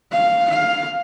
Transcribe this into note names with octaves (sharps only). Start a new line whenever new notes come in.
F5
F5